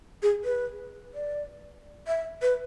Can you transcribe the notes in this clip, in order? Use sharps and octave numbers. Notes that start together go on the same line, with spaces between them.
G#4
B4
D5
E5
B4